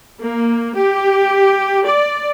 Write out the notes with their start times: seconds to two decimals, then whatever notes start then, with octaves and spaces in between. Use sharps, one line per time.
0.20 A#3
0.75 G4
1.84 D5